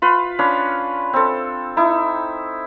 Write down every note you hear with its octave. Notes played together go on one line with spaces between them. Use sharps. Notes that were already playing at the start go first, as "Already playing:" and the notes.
F4 B4
C#4 D4 B4 F5
C4 A4
D#4 E4